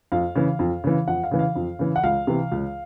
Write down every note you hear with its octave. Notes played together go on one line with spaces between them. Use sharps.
F2 F5
C#3 E3
F2
C#3 E3
F2 F#5
F5
C#3 E3
F5
F2
C#3 E3
F#5
C#2 F5
C3 E3
C#2